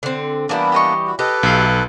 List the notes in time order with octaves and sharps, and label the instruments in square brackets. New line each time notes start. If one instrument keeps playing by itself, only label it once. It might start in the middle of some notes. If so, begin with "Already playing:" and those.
[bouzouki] D3 C4
[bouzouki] E3 G3 E4 [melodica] A#3 B3 D4
[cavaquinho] G4 D#5 C#6
[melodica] F#4
[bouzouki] G4 [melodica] A4 B4 [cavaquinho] D#5
[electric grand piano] B1 [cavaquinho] E5 F5